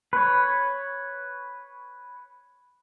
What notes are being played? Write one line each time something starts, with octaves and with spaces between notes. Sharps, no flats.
B4 C#5